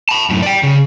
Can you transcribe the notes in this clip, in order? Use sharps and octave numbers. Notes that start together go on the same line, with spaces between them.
A5 B5
F#2 A2
D5 G5
C#3